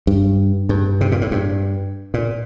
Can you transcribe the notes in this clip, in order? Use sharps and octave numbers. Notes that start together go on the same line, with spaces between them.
G2
G2
C3
A#2
A2
G2
A#2